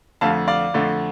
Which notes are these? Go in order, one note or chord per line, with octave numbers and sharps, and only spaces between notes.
F2 D3 A3 F5 A5
D5 F5
F2 D3 A3